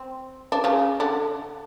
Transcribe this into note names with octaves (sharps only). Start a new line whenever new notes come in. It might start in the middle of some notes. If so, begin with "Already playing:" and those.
Already playing: C4
D4
C#3 C#4
D3 D4